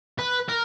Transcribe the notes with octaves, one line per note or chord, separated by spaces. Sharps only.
B4
A#4